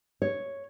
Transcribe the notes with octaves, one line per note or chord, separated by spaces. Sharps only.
C#5